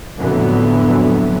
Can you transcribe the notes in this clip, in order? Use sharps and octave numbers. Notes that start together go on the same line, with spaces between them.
F2 A2 D3 E3 F#3 B3